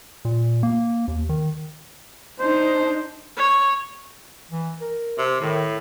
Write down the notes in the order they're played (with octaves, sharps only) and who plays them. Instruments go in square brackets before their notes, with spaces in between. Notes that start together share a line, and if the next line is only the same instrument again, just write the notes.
[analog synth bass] A#2
A#3
D#2
D#3
[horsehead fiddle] D4 D#4 [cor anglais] C5
[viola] C#5
[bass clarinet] E3
A#4
[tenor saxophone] C3
[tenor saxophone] A2 [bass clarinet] D#3